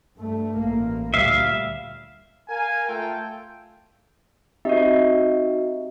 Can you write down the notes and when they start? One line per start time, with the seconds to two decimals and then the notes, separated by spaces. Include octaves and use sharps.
0.17 G2 A3
0.57 A1 A#3
1.14 D2 A#2 G3 E5 F5
2.49 A#4 F5 G#5
2.88 A3 F4 A4 G5
4.65 C4 D#4 F#4 G4 D#5 E5